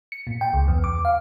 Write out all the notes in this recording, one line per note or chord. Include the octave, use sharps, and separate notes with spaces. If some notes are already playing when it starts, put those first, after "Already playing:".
C#7
A#2
G5
C#2
E2
D6
F5